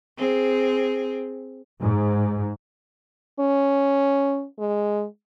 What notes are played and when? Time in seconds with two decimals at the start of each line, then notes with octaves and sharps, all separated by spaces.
0.17 C4 G#4
1.81 G#2
3.40 C#4
4.59 G#3